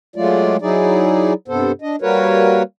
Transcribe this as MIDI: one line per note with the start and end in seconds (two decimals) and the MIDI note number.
0.16 0.57 54
0.16 0.57 56
0.16 0.57 57
0.16 0.57 65
0.16 0.57 74
0.62 1.33 54
0.62 1.33 63
0.62 1.33 64
0.62 1.33 68
0.62 1.33 74
1.48 1.72 43
1.48 1.72 48
1.48 1.72 59
1.48 1.72 69
1.48 1.72 72
1.82 1.96 62
1.82 1.96 75
2.02 2.63 55
2.02 2.63 58
2.02 2.63 66
2.02 2.63 70
2.02 2.63 71
2.02 2.63 73